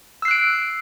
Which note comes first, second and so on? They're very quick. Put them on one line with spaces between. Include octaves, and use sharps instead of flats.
E6 C7 F#6 D7